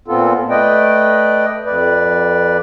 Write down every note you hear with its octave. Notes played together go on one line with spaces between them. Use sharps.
A#2 B3 C4 F4 A4
A3 B4 D5 D#5 G5
F2 B4 D5